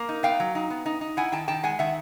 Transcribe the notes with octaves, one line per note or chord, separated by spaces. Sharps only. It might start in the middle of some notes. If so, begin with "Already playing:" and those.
Already playing: A#3
D#4
B3 F5 G5
F#3
D#4
B3
D#4
D#4
E4 F#5 G#5
D#3 G5 A5
D#3 G5 A5
G#3 F#5 G#5
D#3 E5 F#5